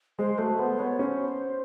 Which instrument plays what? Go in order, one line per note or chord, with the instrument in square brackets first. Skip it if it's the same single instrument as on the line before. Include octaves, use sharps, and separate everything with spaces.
[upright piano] G#3 [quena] C5
[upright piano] A3 [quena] F#4
[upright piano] B3 [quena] C5
[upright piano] B3 [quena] C#5
[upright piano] C#4 [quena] C5